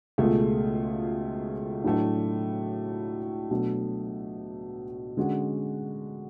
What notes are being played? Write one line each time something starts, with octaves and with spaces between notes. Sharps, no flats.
C#2 B2 A3 F4 G#4
A2 F#3 A3 D4
B2 F#3 A3 D4
D3 G#3 C#4 F#4